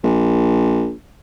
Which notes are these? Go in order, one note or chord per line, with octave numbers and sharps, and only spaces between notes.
A#1